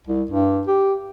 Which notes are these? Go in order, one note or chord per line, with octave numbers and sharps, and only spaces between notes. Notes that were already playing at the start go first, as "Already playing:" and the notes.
C2
G2
G4